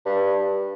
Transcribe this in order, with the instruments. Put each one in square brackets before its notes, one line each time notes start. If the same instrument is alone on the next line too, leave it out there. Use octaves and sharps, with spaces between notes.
[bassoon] G2